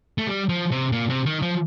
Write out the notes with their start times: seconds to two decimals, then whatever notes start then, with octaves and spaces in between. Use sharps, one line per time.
0.18 A3
0.27 G3
0.49 F3
0.71 C3
0.92 A#2
1.09 C3
1.26 D#3
1.42 F3